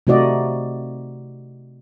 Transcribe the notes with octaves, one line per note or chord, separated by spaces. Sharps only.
C3 A3 D#4 F#4 D5 D#5